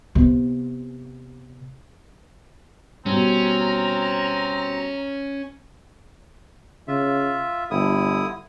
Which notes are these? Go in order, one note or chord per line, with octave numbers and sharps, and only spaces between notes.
C3 B3
B2 G3 C4 C#4 A#5
C#3 F4 E5
G1 D3 E4 D#6